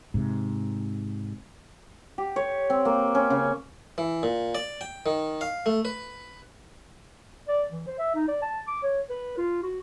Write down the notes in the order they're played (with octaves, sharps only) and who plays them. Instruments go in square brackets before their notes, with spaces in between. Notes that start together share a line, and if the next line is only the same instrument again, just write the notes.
[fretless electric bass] G#2 C3
[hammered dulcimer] G4
C#5
C4
A#3
C#4
C#3
[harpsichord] E3
A#2
D5
G5
D#3
F5
A3
B4
[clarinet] D5
E3
C5
E5
D#4
D5
A5
D6
C#5
B4
F4
F#4